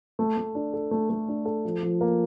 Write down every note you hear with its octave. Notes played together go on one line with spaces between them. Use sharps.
A3
A3
D4
A4
A3
A3
D4
A4
F3
F3
A#3